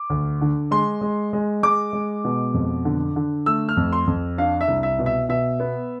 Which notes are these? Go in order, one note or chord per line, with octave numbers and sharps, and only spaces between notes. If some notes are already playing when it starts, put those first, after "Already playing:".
Already playing: D6
D2
D3
G#3 C6
G#3
G#3
G#3 D6
G#3
B2
F2
D3
D3
A3 E6
F6
F2
C6
F2
D4 F5
E5
C2
E5
B2
E5
B2 E5
B3